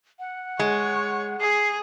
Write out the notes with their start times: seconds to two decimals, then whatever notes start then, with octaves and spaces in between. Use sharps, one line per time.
0.19 F#5
0.59 G#3 C#5
1.41 G#4 C7